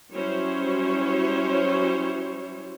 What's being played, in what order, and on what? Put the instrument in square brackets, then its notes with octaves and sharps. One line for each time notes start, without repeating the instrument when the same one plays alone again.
[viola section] F#3 G3 C#4 E4 C5 C#5